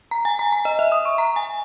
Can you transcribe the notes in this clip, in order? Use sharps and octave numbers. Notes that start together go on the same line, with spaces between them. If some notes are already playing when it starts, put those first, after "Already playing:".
A#5
G#5
A#5
A#5
D#5
E5
D#6
C#6
A#5
G#5